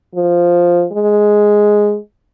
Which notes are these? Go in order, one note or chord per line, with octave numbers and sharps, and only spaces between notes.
F3
G#3